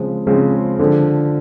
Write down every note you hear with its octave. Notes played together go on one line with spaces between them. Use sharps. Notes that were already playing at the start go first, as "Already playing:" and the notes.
Already playing: C#3 F3 G#3 C4
C#3 F3 G#3 C4
D3 F3